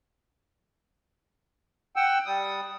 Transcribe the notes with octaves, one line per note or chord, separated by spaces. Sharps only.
F#5 G5 E6
G3 D#6